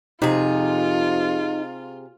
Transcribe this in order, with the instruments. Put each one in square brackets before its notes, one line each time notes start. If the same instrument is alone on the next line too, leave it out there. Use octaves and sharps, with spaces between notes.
[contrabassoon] F2 [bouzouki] C3 G#4 [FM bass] D#4 [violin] F4